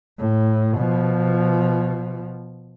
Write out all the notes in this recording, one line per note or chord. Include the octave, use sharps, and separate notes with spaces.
A2
B2 F3